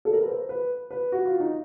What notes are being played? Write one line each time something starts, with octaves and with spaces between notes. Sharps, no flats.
A4
A#4
B4
C5
B4
B4
F#4
F4
D#4